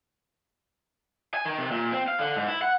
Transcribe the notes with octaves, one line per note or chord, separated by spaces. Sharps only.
G#5
D#3
C3
A#2
C4
F5
D3
G#2
E4
F#5